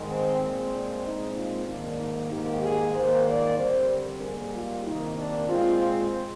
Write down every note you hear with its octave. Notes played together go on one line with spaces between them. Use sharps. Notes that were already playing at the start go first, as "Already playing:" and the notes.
Already playing: G#2 D#3 G#3
C4
A#2 G#3 C4
D4
A#2 G#3 C4 D#4
F4
G#2 D#3 A#3 D4
D#4
G#2 D#3 A#3 G4
G#4
G#2 D#3 A#3 C5
D5
D3 G3 C4 C5
A#4
G#2 G3 A#3 G#4
F4
C3 D#3 A#3 D#4
D4
A#2 G#3 C4 F4
F4